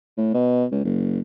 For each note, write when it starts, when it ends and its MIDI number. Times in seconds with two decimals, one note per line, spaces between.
0.18 0.34 45
0.34 0.65 47
0.71 0.83 37
0.85 1.19 30